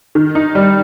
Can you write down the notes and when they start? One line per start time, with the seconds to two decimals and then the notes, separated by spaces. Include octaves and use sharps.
0.15 D#3
0.35 D#4
0.55 G3